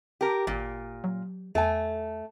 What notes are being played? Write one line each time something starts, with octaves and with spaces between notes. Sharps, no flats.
G4 A#4
G#1 A#2
F#3
E2 A3 G#5